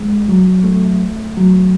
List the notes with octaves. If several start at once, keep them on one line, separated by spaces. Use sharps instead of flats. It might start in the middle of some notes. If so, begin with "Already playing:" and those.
Already playing: G#3
F#3
A3
F#3